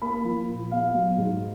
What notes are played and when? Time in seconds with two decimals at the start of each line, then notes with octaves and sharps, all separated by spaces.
0.02 A#3 B5
0.25 F3
0.48 A#2
0.71 B3 F5
0.94 F#3
1.18 G#2